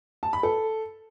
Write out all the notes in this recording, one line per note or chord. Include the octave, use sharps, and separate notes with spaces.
A5
B5
A4